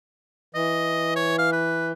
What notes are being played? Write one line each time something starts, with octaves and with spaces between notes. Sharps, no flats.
E3 D#5
C#5
F5
B4